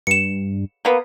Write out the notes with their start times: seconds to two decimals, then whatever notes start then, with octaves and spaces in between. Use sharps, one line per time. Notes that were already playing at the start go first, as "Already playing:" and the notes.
0.07 G2 C#7 E7
0.85 A#3 B3